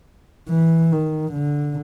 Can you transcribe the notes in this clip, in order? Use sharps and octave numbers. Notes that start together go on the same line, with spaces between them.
E3
D#3
D3